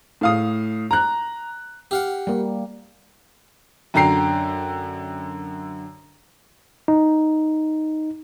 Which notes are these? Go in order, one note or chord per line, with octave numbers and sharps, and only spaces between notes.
A2 F5 D#6
A#5 F#6
G4 F5 F#5
G3 A#3
F#2 D3 G5 A#5 C7
D#4